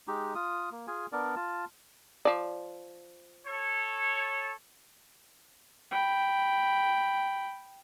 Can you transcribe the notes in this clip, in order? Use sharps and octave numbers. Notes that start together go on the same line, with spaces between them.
G#3 D#4 G4
F4 D#6
A#3
F4 G#4 G#5
B3 D4 A#4 D5
F4 A5
F3 D5
A4 C#5
G5 B5